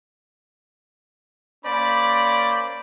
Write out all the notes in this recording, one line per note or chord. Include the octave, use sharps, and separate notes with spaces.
A#3 C#4 C5 D5 B5